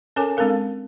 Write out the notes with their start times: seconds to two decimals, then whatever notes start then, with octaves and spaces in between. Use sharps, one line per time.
0.16 C#4 A4 A#4 C#5 G#5 D6
0.37 G#3 C4 D4 A4 A#4 F5